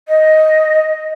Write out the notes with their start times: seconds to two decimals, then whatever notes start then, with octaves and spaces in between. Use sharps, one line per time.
0.08 D#5